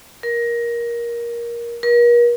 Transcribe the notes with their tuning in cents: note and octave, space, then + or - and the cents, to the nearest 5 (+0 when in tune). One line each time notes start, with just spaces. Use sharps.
A#4 +15
A#4 +40